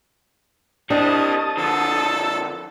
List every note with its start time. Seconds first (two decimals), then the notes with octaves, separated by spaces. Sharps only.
0.90 G3 C4 D4 D#5 A5 D#6
1.57 D3 F3 A4